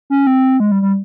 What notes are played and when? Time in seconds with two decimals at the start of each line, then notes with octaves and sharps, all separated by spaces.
0.10 C#4
0.27 C4
0.60 G#3
0.72 G3
0.82 G3